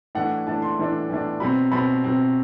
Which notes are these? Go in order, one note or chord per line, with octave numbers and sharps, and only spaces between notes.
A2 E3 A3 D4 F#5
A2 E3 A3 D4 A5
C6
A2 E3 A3 D4
A2 E3 A3 D4
B2 F#3 C4 B5
B2 F#3 C4 B5
B2 F#3 C4